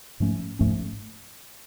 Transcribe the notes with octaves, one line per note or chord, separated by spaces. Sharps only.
G#2 F3 A3 C#4
G#2 F3 A3 C#4